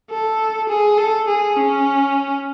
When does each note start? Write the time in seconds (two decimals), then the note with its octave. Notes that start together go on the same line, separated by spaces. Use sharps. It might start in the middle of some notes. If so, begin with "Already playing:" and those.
0.11 A4
0.69 G#4
0.97 A4
1.27 G#4
1.56 C#4